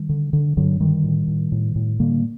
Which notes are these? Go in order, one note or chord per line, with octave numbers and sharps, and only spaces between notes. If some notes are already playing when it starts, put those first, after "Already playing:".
Already playing: D#3 G3
D3
D3
G2 D3 F#3
D3 D#3 G3
A2
A2
A2
A2
D3 G3 A#3